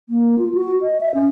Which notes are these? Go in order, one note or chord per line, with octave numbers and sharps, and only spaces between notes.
A#3
F4
F#4
D#5
E5
C#4